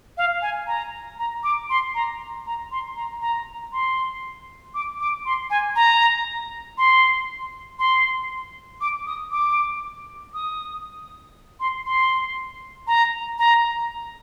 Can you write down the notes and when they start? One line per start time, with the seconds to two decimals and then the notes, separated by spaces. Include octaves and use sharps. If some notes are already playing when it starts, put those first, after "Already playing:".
0.17 F5
0.42 G#5
0.67 A#5
1.18 A#5
1.43 D6
1.70 C6
1.95 A#5
2.46 A#5
2.72 C6
2.96 A#5
3.21 A#5
3.72 C6
4.74 D6
5.00 D6
5.25 C6
5.50 G#5
5.76 A#5
6.78 C6
7.79 C6
8.81 D6
9.06 D#6
9.31 D6
10.34 D#6
11.60 C6
11.86 C6
12.87 A#5
13.38 A#5